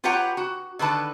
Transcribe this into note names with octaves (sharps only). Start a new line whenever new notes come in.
F4 G4 B4 C#5 F#5 A#5
F#4
D3 D#3 B4 A5